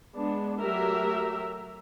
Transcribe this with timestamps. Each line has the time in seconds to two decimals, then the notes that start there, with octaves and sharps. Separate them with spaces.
0.15 G#3 B3 D4
0.61 F#3 A3 G4 A#4 E5